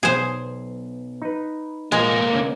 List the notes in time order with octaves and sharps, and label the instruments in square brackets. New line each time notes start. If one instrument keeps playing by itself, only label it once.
[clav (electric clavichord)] B1 [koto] G#4 C5
[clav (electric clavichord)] D#4 B4
[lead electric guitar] C2 A#3 [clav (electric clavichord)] A#2 [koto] G#3
[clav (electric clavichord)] D3 C#4